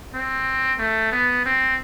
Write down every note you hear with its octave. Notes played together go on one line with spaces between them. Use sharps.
C4
A3
B3
C4